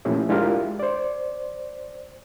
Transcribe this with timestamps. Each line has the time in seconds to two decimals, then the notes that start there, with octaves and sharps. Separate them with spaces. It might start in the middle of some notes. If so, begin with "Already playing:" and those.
0.05 A#2 F3 A3 C#4 E4 G4
0.29 G#3 D4 E4 F4 G4 A#4
0.80 C5 D5